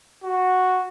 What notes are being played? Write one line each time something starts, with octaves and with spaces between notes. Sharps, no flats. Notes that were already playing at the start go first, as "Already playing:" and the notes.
F#4